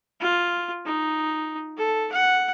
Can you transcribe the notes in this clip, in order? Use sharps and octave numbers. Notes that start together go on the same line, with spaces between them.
F4
D#4
A4
F#5